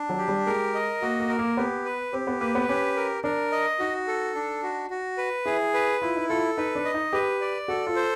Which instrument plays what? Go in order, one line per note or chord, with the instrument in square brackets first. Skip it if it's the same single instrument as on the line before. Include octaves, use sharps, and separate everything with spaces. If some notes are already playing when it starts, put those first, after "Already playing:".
Already playing: [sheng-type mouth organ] D4
[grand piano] F#3
[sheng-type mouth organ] G4
[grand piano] G3
[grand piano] G#3 [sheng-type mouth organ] A#4
[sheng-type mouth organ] D#5
[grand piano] A#3 [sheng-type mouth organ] F#4
[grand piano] A#3
[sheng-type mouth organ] A#4
[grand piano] A#3
[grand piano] B3 [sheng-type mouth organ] G4
[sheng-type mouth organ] B4
[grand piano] C4 [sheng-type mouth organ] G4
[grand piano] B3
[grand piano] A#3 [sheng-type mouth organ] B4
[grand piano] B3
[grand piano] C#4 [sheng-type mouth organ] G4
[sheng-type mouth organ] A#4
[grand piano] D4 [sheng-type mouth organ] A#4
[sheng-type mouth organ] D#5
[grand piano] D#4 [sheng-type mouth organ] F#4
[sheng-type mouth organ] A4
D4
F#4
F#4
B4
[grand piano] E4 [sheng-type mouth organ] G#4
[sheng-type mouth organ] B4
[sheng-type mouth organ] E4 [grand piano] F4
[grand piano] D#4
[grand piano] F4 [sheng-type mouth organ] A4
[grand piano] D#4 [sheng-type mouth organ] B4
[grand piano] D4
[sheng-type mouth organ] D#5
[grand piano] D#4
[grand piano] G4 [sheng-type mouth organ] B4
[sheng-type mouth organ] D5
[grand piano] F#4 [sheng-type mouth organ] A4
[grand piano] F4
[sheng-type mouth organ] C5